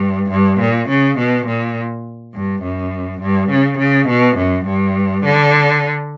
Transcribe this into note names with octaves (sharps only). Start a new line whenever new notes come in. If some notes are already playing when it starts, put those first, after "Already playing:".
Already playing: G2
G2
A#2
C#3
B2
A#2
G2
F#2
G2
C#3
C#3
B2
F#2
G2
D3